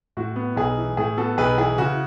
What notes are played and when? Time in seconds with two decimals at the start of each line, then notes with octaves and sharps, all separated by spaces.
0.17 A2 F#4
0.36 B3
0.56 B1 G#4
0.78 E3
0.97 A2 G#4
1.17 B3 F#4 A4
1.38 B1 G#4 B4
1.58 E3 G#4
1.78 C#3 F#4